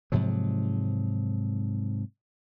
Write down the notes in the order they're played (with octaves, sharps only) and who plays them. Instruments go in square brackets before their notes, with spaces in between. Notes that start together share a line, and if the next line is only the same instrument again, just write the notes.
[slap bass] G#2 C3 F3 F#3